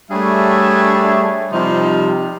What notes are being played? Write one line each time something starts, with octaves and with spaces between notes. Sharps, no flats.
G3 A3 D4 G#4 C#5 E5
C3 F3 G3 D#4 C5